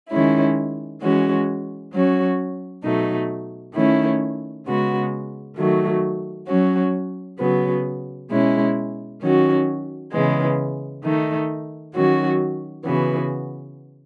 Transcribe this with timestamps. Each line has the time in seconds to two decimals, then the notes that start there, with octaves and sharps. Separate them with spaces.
0.11 D#3 G#3 C#4 E4
1.01 E3 G#3 C#4 F#4
1.92 F#3 C#4 F#4
2.83 B2 F#3 A3 D#4
3.74 D#3 A3 C#4 E4
4.65 C#3 G#3 B3 F#4
5.56 D#3 F#3 A3
6.48 F#3 C#4 F#4
7.39 C#3 F#3 B3
8.30 B2 G#3 C#4 E4
9.21 D#3 F#3 C#4 F#4
10.12 C#3 E3 G#3 B3
11.04 D#3 A3 D#4
11.94 D#3 F#3 C#4 F#4
12.85 C#3 E3 B3 F#4